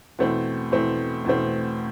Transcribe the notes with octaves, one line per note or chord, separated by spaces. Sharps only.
E2 B2 A3 C4
E2 B2 A3 C4
E2 B2 A3 C4